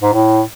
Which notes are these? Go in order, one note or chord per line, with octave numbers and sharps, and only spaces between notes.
G#2
A2